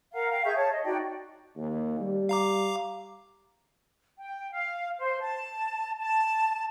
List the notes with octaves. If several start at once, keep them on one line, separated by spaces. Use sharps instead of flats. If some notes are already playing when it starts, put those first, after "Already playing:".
A#4 F5 F#5 A#5
F5 G5
G#4 E5 C#6 G6
C#5 A5
D#5
D#4 F#4 D5 G5
D#2
G3
F5 A#5 D6
G5
F5
C5
A5
A5